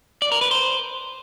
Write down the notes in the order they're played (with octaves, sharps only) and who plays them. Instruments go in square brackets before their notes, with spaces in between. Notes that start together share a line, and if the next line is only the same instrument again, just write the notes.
[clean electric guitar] D5
A#4
B4
C5